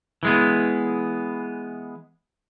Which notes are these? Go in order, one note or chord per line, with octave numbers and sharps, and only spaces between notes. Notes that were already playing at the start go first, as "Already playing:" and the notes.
E3 G#3 B3